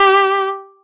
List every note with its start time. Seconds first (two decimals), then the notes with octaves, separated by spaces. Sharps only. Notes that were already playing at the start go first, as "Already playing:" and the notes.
Already playing: G4